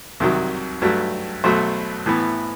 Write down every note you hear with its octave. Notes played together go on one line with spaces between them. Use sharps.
C2 C3 D#3 F#3
G2 F#3 A3
B1 B2 F#3 A3 C5
A2 E3 B3